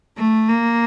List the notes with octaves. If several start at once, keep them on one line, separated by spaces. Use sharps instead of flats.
A3
A#3